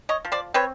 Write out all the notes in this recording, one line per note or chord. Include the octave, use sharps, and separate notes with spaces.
C#5 D#5
F3
C5 D5
C4 B4 C#5